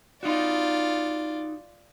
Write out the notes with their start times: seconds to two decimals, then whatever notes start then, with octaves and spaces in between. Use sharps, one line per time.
0.23 D#4 F4 F#4 D5